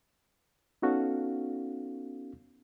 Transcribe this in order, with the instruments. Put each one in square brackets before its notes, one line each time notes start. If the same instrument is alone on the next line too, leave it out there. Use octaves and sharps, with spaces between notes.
[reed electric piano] B3 C#4 D#4 F#4 A4 F5